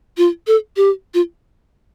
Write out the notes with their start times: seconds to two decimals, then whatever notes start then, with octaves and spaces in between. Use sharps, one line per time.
0.17 F4
0.47 A4
0.77 G4
1.14 F4